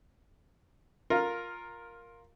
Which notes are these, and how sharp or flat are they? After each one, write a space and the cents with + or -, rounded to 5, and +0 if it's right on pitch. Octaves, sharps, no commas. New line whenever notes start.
F4 +10 A#4 +0